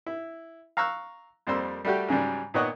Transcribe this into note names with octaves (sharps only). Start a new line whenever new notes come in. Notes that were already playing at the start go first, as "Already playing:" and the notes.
E4
F5 A#5 C#6 E6 F#6
F2 G3 A#3 C5 E6
G3 A3 F#4 G4
G#2 C#3 F#3 G3
A#2 D#3 B3 C#5 D#5 F#5